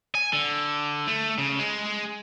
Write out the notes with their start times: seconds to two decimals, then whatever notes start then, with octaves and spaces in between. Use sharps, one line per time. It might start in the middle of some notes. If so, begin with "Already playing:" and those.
0.15 G#5
0.33 D3
1.07 A3
1.38 C#3
1.59 G#3